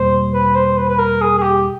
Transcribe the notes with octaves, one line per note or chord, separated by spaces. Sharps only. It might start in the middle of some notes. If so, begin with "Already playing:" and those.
Already playing: E2 B2 G3 A#3 C5
B4
C5
B4
B4
A#4
G#4
G#4
G4